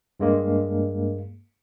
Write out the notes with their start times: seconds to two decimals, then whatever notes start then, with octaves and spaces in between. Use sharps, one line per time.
0.20 G2 G#3 A#3